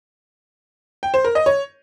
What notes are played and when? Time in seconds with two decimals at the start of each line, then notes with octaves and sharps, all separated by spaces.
1.03 G5
1.14 C5
1.24 A#4
1.35 D#5
1.46 C#5